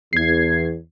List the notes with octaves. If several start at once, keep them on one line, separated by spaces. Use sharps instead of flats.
E2 G#6 C7